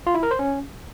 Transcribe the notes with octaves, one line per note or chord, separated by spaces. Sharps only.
F4
E4
A#4
C5
C#4